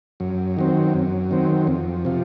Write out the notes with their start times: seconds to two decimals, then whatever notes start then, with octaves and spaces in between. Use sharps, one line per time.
0.20 F#2
0.57 D#3 F#3 C4
0.94 F#2
1.31 D#3 F#3 C4
1.67 F2
2.05 C3 F3